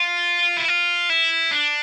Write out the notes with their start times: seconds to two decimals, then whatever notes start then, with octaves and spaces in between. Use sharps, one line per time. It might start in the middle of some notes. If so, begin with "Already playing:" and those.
Already playing: F4
0.57 E4
0.68 F4
1.10 E4
1.51 D4